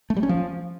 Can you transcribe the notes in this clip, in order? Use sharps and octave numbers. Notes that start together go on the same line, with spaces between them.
A3
G3
C#4
F3